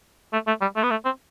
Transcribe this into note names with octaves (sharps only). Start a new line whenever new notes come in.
A3
A3
G3
A3
B3
A3
C4